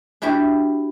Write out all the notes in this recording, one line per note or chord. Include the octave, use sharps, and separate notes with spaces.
D4 E4 F#4 G4 E5